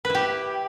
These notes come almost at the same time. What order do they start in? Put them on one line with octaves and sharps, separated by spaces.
B4 E4 G4